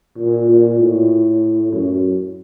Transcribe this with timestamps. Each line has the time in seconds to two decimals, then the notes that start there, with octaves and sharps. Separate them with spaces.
0.18 A#2
0.50 A#2
0.79 A2
1.72 F#2